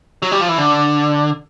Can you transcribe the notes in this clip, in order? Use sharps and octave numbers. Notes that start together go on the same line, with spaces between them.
F#3
G3
F3
E3
D3